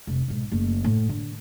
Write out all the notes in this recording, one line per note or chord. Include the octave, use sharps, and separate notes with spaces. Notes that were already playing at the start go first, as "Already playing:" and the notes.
F1 C2
B1 G#2
F#1 A3
A2
D3